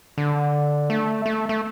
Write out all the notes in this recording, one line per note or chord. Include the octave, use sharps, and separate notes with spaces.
D3
A3
A3
A3